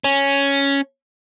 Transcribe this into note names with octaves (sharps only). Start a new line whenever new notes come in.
C#4